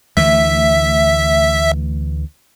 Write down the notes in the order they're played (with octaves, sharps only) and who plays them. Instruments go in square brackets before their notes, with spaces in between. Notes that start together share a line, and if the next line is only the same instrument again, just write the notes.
[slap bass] D2 E3 A3 [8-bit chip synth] E5